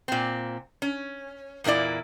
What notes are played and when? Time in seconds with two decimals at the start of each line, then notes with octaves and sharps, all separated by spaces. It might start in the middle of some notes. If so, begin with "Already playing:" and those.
0.08 A#2 C4
0.82 C#4
1.64 E2 A#2 A#3 E4 D5